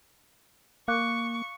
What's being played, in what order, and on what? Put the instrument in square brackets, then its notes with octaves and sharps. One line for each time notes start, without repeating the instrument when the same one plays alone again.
[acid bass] A#3 [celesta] F5 D6 F#6 [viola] C#6